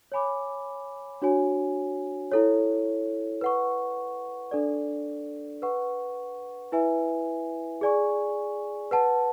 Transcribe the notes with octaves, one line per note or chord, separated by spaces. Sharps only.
C#5 G#5 B5 D6
D4 F#4 C#5 G#5
E4 A4 C#5
B4 F#5 C#6
D4 A4 D5
B4 F#5 C#6
E4 B4 E5 G#5
G#4 D5 G#5 C#6
B4 F#5 A5